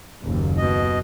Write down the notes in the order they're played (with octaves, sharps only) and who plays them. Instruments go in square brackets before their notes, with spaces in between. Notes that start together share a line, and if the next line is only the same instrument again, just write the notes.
[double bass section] F#1 D#2
[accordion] B2 D#5